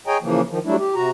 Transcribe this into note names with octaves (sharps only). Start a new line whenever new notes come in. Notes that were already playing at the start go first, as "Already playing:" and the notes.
G#4 C#5 D#5 G5 G#5 A#5
C#3 E3 F3 A#3
D#3 F3
F#3 G3 A3 D4 E4
G4
C3 F#4 A#5